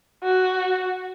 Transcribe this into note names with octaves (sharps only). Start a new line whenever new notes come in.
F#4